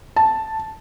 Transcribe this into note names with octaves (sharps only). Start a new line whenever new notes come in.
A5